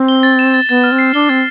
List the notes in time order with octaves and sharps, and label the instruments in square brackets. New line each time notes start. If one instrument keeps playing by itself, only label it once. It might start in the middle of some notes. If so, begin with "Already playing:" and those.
Already playing: [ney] C4
[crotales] G7
A6
E7
A6
[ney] B3 [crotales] A6
[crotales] F6
[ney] C4
[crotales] C7
[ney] D4 [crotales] G7
[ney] C4 [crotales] A6